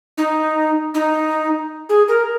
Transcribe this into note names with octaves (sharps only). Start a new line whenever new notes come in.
D#4
D#4
G#4
A#4